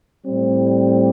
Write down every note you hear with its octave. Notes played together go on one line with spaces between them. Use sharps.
A2 G3 C4